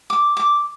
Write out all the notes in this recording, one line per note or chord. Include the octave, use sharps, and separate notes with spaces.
D6
D6